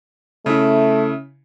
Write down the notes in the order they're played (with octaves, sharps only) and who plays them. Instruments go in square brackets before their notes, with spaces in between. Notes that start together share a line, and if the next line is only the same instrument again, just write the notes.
[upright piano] C#3 E4 [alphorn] A3